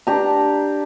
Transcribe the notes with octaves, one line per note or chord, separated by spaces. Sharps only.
D4 G4 A#5